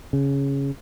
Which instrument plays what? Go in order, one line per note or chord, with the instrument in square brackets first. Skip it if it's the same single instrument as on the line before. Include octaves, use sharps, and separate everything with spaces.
[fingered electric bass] C#3